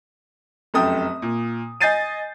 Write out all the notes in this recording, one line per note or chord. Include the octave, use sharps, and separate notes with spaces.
F1 F#2 A4 G5 D#6
A#2
D#5 G#5 G6 A6 C7 D#7